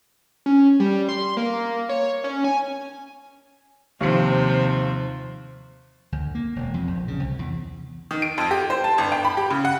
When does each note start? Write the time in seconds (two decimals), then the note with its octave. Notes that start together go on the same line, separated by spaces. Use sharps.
0.46 C#4
0.80 G3
1.09 C6
1.37 A#3
1.89 C#5
2.24 C#4
2.44 G#5
4.01 D#2 C3 F3
6.12 D2
6.35 A#3
6.56 E1
6.74 F2
6.87 A#1
7.08 C#3
7.20 C2
7.39 E2
8.11 D#3
8.22 D7
8.38 F2
8.51 G4
8.70 C5
8.84 A5
8.98 G1
9.12 G5
9.25 B5
9.37 G4
9.50 C#3
9.65 F#5